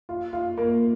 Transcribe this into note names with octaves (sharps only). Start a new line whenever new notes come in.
F4
F4
A#3